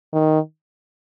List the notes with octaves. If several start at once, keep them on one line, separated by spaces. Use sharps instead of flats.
D#3